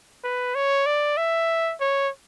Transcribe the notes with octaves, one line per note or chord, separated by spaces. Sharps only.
B4
C#5
D5
E5
C#5